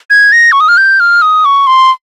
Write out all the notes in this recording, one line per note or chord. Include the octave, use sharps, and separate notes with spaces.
G#6
A#6
C#6
D#6
F6
G6
F6
D#6
C#6
C6